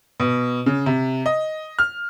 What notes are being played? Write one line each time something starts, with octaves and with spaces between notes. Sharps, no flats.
B2
C#3
C3
D#5
F6